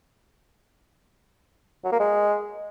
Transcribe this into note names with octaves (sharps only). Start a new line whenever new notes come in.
F#3
A#3
G#3